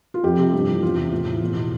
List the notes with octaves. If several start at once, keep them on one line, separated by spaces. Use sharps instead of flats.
F4
F2 G4
C3 F3
G2
E3
E2 F4
C3 E3
A2
E3
E2
B2